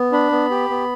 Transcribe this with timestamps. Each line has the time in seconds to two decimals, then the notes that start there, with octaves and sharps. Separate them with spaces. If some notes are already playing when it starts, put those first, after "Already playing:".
Already playing: B3
0.12 D4 B5
0.32 B3
0.50 G4
0.70 B3